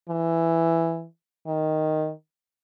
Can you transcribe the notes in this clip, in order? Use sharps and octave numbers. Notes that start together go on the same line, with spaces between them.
E3
D#3